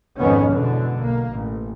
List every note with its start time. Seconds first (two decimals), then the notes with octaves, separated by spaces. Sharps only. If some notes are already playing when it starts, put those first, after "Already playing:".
0.18 F2 G#2 B2 D#3 B3 C#4
0.50 G#2 B2 D3 E3
0.98 B1 A#3
1.31 A1